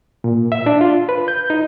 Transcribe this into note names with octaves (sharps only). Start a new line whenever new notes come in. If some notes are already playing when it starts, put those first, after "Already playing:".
A#2
E5
D4
F4
B4
G6
D#4